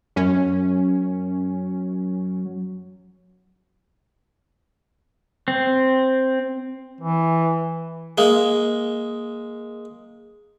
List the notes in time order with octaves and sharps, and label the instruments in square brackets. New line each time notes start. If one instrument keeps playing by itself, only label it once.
[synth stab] F#2 C#4 [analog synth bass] F#3
[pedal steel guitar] C4
[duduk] E3
[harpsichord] G#3 A#3